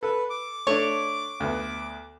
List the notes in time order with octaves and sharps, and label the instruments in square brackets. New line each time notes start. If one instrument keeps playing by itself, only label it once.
[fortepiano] A4 [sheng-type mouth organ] B4
[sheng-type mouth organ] D6
[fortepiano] A3 D4 [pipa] C#5
[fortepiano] D2 B3